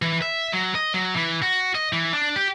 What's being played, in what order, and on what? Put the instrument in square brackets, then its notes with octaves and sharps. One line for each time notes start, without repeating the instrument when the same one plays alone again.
[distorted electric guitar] E3
E5
F#3
D#5
F#3
E3
F#4
D#5
E3
D4
G4